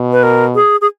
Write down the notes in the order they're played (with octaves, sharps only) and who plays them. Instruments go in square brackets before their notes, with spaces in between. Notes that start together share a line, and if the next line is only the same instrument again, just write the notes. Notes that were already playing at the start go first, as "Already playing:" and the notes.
Already playing: [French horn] B2
[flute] B4
A#4
G#4
G#4